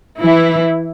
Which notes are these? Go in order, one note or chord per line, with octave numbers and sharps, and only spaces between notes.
E3 E4